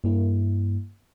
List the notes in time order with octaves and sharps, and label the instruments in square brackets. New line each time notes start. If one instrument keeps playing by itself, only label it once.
[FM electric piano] G2 A#3 E4